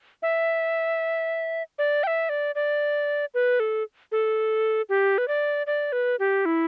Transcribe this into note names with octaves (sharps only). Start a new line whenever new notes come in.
E5
D5
G5
E5
D5
D5
B4
A4
A4
G4
B4
D5
D5
B4
G4
E4